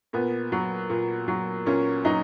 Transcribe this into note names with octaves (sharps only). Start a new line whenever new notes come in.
A#2 B3
F#3
A#2
F#3
A#2 C#4
F#3 D#4